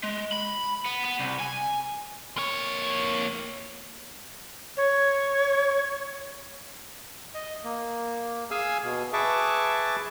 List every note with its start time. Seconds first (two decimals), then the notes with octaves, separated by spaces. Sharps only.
0.04 G#3
0.32 B5
0.85 B3
1.05 B3
1.19 C2
1.40 G#5
2.37 A#3 C#5
4.77 C#5
7.34 D#5
7.64 A#3
8.51 G#4 F5 G#5 E6
8.83 B2
9.13 G#4 B4 E5 A5 C#6 D6